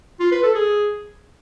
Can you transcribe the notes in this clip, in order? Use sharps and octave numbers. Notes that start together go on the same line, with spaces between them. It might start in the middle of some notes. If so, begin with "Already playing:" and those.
F4
B4
A4
G#4